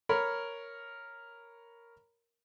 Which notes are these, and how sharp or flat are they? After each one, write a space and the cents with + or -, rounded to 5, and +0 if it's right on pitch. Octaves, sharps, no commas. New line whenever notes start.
A#4 +0 C#5 +0 B5 +0